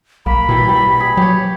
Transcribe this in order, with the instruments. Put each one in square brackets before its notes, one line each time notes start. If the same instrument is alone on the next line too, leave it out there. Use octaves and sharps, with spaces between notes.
[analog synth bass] B1 [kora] A#3 [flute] B5
[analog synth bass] B2 [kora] E3 G3
[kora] G3
G#4
[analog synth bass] F#3 [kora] G4 C#5